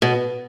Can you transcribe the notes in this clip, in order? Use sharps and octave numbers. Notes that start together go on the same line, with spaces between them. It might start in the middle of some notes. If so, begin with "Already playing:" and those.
B2